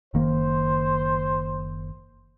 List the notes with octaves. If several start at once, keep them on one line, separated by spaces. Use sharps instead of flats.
F#1 D#3 A#3 C5